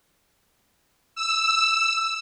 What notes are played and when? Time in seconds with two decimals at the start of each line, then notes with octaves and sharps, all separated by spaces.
1.16 E6